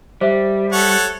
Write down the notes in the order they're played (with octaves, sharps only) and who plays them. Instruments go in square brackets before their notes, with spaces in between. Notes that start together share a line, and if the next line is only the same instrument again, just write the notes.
[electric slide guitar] G3 [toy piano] C5 E5
[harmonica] A4 C#5 F#5